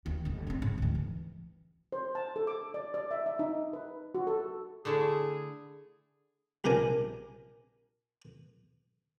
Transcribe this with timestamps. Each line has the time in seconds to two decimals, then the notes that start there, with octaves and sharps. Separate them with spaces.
0.06 D#2
0.25 G1 D#2
0.47 C#3 C4
0.62 G#2
0.78 D2 D#3
0.95 E3
1.92 C5
2.15 A5
2.36 A4
2.47 D6
2.74 D5
2.94 D5
3.11 E5
3.26 E5
3.39 D#4
3.73 B4
4.15 F#4
4.27 A4
4.85 D3 A3 E4 G#4
6.64 A#1 C3 D4 A#4 G#5